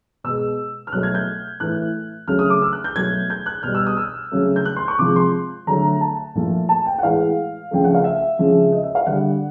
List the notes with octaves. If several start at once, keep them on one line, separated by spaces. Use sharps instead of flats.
B2 G#3 E6
F6
B2 F#3 A3 F#6
G#6
G6
A2 E3 A3 F#6
C#3 F#3 A3 F6
D#6
D6
E6
F#6
G6
B2 F#3 A3 G#6
G6
F#6
B2 G3 F6
E6
D#6
E6
C#3 F#3 A3
G6
F#6
C6
C#6
C3 F3 G#3 D6
C6
D3 F#3 A3 A#5
A5
A#2 F3 A3
A5
G5
F#5
A2 E3 G#3 F5
C#3 F3 A3 G5
F#5
F5
E5
C#3 F3 G#3
D#5
E5
F5
D3 G3 F#5